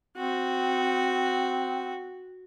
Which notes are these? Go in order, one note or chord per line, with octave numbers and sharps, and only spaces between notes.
C4 F#4